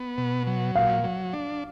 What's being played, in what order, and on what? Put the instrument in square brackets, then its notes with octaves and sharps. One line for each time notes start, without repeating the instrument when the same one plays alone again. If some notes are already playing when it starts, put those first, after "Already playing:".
Already playing: [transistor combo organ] B3
B2
F#3
[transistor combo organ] A#2 [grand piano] F5
[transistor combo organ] F#3
D4